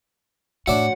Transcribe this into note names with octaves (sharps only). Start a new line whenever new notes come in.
A2 D4 F#4 C#5 D5 E5 F#5